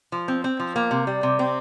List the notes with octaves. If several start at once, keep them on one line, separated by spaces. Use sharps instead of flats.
F3
C4
C4
F3
A#3
C3
G3
C3
C4